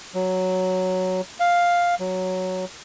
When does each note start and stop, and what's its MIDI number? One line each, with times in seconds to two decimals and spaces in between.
0.15 1.21 54
1.40 1.95 77
2.00 2.65 54